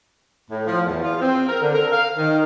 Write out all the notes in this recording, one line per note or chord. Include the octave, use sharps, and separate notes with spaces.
A2
F3
E2
F4
C4
A#4
D3
A#4
F5
D#3